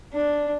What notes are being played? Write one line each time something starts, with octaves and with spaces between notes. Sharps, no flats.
D4